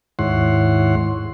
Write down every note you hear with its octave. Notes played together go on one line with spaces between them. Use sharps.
D#2 G#2 E4 C#5 F#5 C6